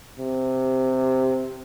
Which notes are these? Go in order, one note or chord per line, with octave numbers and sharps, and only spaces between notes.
C3